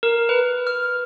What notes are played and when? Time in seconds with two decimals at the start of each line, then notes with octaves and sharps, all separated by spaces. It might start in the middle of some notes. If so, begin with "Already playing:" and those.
0.03 A#4
0.29 B4
0.67 F6